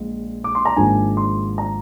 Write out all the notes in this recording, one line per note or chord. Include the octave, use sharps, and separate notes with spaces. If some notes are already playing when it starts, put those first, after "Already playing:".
Already playing: A#1 A#2 G#3
D6
C6
A#5
G#1 G#2 F3 A#3 D4 G#5
C6
A#5